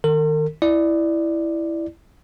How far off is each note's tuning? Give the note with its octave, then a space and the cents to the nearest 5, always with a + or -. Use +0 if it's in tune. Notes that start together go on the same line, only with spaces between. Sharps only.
D#3 -5 A#4 -45
E4 +0 D5 +10